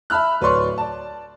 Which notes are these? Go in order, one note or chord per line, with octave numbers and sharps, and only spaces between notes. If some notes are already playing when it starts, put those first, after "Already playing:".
E5 A5 B5 F6 F#6
D1 B4 C#5 D5 C6 C#6
D5 A5